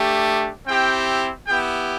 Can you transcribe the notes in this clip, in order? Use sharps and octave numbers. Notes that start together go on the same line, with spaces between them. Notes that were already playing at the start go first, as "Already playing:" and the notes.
Already playing: A3 D4 G4
C4 E4 G4 G5
B3 E4 G4 G5